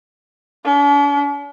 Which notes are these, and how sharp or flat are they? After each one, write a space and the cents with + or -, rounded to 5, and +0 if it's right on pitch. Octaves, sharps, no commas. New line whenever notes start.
D4 -45